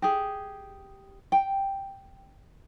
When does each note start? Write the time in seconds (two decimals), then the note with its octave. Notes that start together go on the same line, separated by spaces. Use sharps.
0.02 G4 G#4
1.32 G5